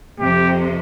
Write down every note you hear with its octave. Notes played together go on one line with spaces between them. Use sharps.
F2 C3 F3 G4